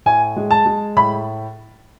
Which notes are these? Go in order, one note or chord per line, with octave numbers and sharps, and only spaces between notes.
A2 G#5
G#3
A5
G#3
A2 B5